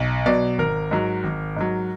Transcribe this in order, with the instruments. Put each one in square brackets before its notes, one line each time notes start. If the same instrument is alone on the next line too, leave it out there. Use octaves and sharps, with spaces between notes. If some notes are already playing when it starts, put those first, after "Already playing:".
Already playing: [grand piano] B1
B2 F#3 D5
G#1 A#4
G#2 F#3
G#1
G#2 F#3